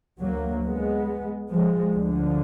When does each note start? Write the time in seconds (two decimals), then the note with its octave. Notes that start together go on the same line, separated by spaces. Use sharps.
0.19 D2 F#3 A#3
0.63 G#3 B3
1.50 F3 G#3
1.93 D2 D3 F3